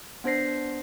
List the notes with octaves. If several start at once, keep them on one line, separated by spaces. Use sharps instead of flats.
B3 D4 C5 A#6 C7